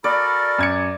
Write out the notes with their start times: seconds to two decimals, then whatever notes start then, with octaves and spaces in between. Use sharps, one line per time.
0.04 F#4 A4 A#4 D5 B5
0.58 F#2 G#6 C#7